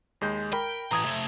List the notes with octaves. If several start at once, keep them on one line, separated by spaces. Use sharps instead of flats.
D#2 G#3 G6
A#4 G5 B5
A2 E3 A#5 D#6 G#6
C3 A3